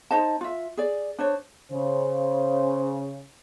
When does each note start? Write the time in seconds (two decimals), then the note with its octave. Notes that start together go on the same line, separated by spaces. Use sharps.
0.11 D#4 C5 D#5 A5
0.41 F4 E5
0.77 G#4 D5
1.19 D4 C5 C#5
1.71 C#3 G#4 C5